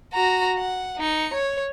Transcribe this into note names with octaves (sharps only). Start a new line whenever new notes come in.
F#4 A#5
F#5
D#4 C#7
C#5